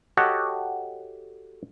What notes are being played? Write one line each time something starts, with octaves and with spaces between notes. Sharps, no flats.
F#4 G4 A4 C#5 D#5 F#5